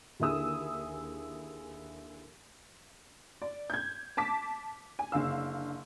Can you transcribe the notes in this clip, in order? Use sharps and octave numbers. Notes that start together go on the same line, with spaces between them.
D#2 D3 E4 G#4 D#6 E6
D5
G6 G#6
A5 D6 B6
G#5
F#1 D3 F5 E6